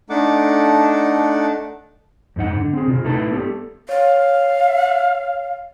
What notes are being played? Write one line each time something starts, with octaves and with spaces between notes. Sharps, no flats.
A3 D4 D#4 A4 F#5 D6
F2 G#2 D#4 F#5
D3
C4 G#4
C3 F4
A3 D#4 E4 A4 B4 A5
B3 G4 A4
C#5 F5